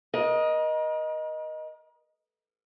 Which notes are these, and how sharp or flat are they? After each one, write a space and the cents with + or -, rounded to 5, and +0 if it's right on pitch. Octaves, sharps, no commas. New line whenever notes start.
A#4 +40 D#5 +0